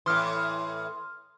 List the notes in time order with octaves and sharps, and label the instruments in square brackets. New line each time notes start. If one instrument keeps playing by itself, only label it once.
[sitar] A2 E3 [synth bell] C6 D#6 F6